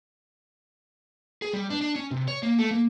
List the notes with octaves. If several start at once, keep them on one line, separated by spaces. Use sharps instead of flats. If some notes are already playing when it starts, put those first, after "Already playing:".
G#4
G3
D4
D4
C#4
C3
C#5
A#3
A3
A#3